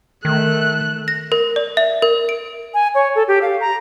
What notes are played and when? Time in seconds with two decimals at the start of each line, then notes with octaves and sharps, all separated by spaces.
0.25 D#3 A3 F#6
1.08 A#6
1.32 A#4
1.56 D5
1.77 E5
2.02 A#4
2.29 D7
2.74 G#5
2.95 C#5
3.15 A4
3.28 G4
3.42 F5
3.61 A#5